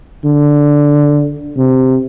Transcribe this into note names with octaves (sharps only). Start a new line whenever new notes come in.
D3
C3